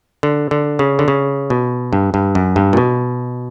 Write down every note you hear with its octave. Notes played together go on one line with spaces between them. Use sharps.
D3
D3
C#3
D3
C#3
B2
G2
G2
F#2
G2
A#2
B2